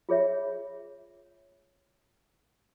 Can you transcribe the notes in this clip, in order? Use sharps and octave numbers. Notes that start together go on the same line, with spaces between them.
F4 G#4 C#5 E5